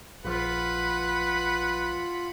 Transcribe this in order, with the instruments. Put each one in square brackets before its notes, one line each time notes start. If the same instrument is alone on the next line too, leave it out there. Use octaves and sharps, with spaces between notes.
[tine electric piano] A#1 F3 [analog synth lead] F4 [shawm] B4 [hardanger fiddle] F#5 B5